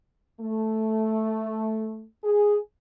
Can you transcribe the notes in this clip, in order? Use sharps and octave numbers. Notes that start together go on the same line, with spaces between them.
A3
G#4